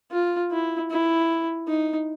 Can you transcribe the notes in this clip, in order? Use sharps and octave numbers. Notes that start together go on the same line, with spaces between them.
F4
E4
E4
D#4